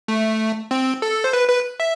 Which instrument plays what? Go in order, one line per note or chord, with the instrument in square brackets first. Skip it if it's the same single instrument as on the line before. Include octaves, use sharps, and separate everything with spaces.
[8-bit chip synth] A3
C4
A4
C5
B4
B4
E5